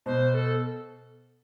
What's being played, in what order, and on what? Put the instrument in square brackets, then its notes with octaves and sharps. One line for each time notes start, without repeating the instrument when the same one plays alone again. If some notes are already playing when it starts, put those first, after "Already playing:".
[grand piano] B2 [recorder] C5
[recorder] C5
A4